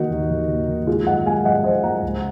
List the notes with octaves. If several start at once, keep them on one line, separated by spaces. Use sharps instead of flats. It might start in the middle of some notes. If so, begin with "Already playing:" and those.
Already playing: D#3 A#3 D#4 F#4
D#2
D#3
A#3
D#3
G#3 F4 G#4
F#2 D#5 F#5
G#3 F5 G#5
F#2 D#5 F#5
F3 C5 D#5
G#3 F#5 A#5
C#2